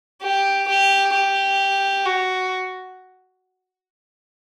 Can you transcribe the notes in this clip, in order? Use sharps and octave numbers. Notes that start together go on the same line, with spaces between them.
G4
G4
G4
F#4